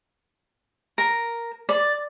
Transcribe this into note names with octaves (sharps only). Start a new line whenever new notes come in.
A#4
D5